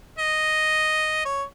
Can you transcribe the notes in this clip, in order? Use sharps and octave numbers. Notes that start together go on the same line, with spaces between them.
D#5
C#5